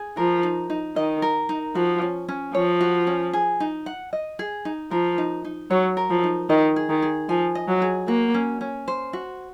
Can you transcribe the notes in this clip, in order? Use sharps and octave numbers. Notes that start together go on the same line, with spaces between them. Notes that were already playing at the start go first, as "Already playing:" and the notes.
Already playing: G#4
F3 A#4
D#4
D#4
D#3 D#5
A#4
D#4
F3 F#4
C#4
C#4
F3 C#5
F#4
C#4
G#4
D#4
F#5
D#5
G#4
D#4
F3 A#4
D#4
D#4
F#3 C#5
A#4
F3
D#4
D#3 D#5
G#4
D#3
G#4
F3 G#5
D#5
F#3
G#4
A#3 F#4
C#4
C#4
C5
F#4